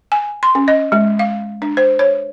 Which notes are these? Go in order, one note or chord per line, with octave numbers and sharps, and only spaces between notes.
G#5
C6
C#4
D#5
G#3
F5
D4
C5
C#5